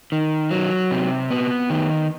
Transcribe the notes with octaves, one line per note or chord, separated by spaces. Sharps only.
D#3
F#3
C3
B3
D#3